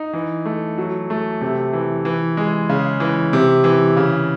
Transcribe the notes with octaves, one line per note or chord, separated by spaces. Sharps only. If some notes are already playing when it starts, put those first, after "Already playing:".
Already playing: D#4
E3
A3
F#3
A3
C3
E3
E3
G#3
C#3
E3
C3
E3
C#3